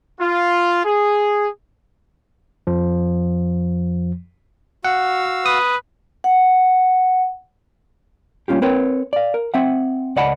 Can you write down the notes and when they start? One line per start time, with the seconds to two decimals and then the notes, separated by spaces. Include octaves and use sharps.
0.20 F4
0.84 G#4
2.67 F2 F3
4.85 F#4 F5 F#5 E6
5.46 B4 D#6
6.24 F#5
8.48 G3 A#3 C#4 F4 G4
8.62 C4 A#4 B4 C#5
9.13 D5 F5
9.34 A#4
9.54 C4 E5 F#5
10.16 C#2 D5 D#5 F#5 A5 B5